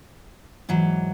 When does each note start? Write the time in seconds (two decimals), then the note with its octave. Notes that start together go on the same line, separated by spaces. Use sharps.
0.69 G#2 E3 F#3